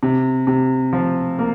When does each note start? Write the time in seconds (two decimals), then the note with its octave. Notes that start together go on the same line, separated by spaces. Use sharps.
0.03 C3
0.47 C3
0.93 F3
1.39 A#3